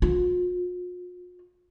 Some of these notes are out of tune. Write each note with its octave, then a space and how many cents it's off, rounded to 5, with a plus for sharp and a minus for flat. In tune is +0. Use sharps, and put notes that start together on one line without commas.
F4 +45